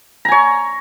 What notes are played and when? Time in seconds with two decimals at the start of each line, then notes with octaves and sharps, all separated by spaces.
0.25 A#5
0.28 G#5
0.32 C#5